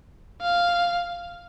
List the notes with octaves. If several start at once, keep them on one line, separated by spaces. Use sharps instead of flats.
F5